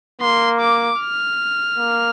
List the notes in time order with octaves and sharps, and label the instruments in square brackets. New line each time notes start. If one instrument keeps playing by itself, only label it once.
[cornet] A#3 [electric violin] C6
[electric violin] D6
F6
[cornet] A#3